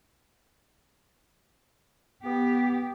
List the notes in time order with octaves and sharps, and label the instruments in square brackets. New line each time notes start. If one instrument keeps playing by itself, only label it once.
[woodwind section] B3 [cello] G4